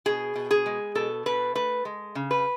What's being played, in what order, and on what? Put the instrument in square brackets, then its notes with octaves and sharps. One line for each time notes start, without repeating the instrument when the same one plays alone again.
[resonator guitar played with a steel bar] B2 G#4
B2
G#4
G#3
B2 A4
B2 B4
A3 B4
G#3
C#3
B4